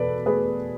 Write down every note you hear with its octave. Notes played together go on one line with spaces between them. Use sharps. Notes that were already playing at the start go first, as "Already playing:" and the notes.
Already playing: E2 B2 A4 B4 D5
A3 G#4 B4